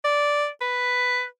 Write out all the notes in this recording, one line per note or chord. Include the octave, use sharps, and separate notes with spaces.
D5
B4